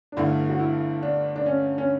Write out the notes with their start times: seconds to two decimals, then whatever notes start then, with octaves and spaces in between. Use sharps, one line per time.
0.12 D4
0.17 G1 G2 D3 A3 E4
0.49 F#4
0.59 E4
1.03 D4
1.36 D4
1.46 C#4
1.78 C#4